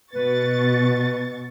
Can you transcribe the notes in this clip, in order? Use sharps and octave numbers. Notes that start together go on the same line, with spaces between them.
B2 B4 C#6 A6